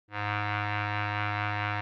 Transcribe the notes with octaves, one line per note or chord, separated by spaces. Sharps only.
G#2